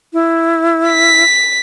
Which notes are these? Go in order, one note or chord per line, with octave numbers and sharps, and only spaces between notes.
E4
B6